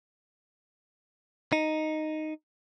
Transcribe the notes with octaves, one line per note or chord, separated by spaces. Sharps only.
D#4